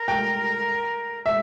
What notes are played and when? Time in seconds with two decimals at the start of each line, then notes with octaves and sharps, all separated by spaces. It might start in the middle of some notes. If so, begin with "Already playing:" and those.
Already playing: A#4
0.08 G5
1.26 E5